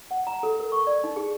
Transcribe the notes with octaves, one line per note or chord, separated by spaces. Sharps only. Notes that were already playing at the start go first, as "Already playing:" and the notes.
F#5
A#5
A4
A#4
C#6
D5
D#4
G#4